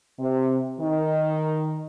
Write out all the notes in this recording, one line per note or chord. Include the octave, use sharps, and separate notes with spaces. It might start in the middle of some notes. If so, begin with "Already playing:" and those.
C3
D#3